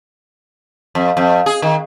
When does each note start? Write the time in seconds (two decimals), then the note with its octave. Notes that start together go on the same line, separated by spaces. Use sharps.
0.95 F2
1.17 F2
1.46 G#4
1.62 D#3